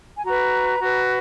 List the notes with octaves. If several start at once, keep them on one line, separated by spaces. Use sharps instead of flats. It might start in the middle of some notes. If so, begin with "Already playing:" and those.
G#5
F#4 B4 A#5
F#4 B4